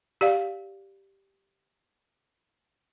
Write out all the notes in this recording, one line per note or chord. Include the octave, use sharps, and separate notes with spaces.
G4 D5 F5